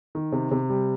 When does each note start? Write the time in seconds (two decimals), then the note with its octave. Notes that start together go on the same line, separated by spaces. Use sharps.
0.15 D#3
0.32 C3
0.51 C3
0.70 G3